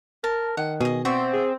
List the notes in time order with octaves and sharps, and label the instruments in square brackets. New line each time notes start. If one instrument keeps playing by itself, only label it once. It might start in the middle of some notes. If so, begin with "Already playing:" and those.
[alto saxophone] A#4 [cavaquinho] A5
[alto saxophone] D#3 [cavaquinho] F#5
[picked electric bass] B2 [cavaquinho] G#4 D#5
[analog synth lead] C4 [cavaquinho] F#4 D5 E5
[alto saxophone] G#4